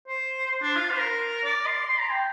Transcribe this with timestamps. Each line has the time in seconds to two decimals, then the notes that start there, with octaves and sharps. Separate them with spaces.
0.08 C5
0.62 D4
0.76 F4
0.91 C5
0.99 A#4
1.44 D5
1.66 C6
1.89 C6
1.99 A#5
2.11 G5